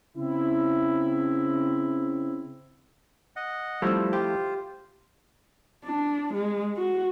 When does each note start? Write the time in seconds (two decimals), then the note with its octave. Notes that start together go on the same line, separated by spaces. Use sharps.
0.17 C#3 C4 E4
3.36 D#5 F#5
3.82 F3 G3 A3 C4 E4
4.13 F4 G4 C5
5.85 D4
6.33 G#3
6.77 F#4